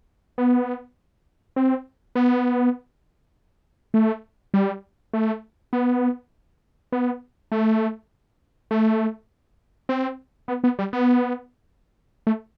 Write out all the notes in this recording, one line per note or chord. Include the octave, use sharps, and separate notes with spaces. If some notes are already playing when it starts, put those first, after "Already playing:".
B3
C4
B3
A3
G3
A3
B3
B3
A3
A3
C4
B3
B3
G3
B3
A3